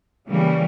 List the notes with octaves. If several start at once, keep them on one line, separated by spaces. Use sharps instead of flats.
C#3 E3 G3 A#3